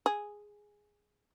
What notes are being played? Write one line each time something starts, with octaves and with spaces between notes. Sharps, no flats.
G#4